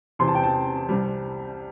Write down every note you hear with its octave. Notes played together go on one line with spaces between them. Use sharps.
E2 C3 E3 C6
A5
G5
A5
C2 C3 G3